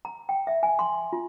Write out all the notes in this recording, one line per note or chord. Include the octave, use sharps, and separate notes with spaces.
A#5
G5
E5
G#5
C6
F4